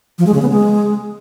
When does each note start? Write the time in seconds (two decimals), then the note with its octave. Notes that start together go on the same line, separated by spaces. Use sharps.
0.19 F3
0.26 G#3
0.34 C#3
0.42 B3
0.50 G#3